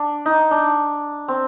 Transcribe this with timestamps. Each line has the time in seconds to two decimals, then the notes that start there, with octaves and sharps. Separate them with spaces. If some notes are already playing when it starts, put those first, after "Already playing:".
Already playing: D4
0.26 D#4
0.51 D4
1.28 C4